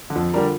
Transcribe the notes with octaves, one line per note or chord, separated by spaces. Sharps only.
D3
F2 F3
D3 G3 D4 A#4